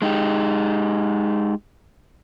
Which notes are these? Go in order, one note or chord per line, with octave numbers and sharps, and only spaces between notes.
G#3 D#4 G4